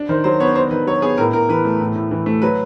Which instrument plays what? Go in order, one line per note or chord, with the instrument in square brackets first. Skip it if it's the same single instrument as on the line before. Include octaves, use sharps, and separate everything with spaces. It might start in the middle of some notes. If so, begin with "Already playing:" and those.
Already playing: [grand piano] D4
[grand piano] D#3 [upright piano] C5
[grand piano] F#3 [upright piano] C5
[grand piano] B3 [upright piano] C#5
[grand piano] D4 [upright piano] C5
[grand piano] D#3 [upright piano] B4
[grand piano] F#3 [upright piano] C#5
[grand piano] B3 [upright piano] G#4
[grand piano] A2 [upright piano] A#4
[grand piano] A2 [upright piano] A#4
[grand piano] E3 [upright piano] B4
[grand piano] A3
A2
A2
E3
A3
[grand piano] F#3 [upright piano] B4